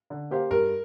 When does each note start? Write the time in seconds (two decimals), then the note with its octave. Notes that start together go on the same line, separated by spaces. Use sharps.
0.10 D3
0.31 A#3 G4 C5 F5
0.51 G2 A#4